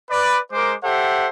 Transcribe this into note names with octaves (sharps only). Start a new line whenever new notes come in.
B4 D5
G#3 A#4 C5 D6
G4 A4 C5 E5 F#5